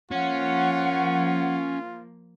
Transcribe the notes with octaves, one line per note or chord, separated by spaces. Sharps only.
F3 A#3 C#4 F4 F#5